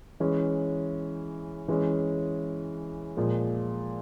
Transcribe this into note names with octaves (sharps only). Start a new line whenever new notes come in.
E3 G#3 C#4
E3 G#3 C#4
A#2 F3 G#3